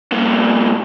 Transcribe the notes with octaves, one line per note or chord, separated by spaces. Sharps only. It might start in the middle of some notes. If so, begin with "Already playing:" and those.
G2 A#2